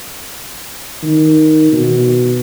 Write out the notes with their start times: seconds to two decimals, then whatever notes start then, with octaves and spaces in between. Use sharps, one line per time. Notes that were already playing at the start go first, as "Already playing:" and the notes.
1.03 D#3
1.72 B2